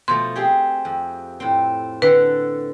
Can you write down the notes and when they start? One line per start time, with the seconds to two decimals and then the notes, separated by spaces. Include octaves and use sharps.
0.08 B2 F3 A3 C6
0.35 C4 G4 G#4
0.85 F2
1.40 A2 C4
2.02 D3 A4 B4 F#5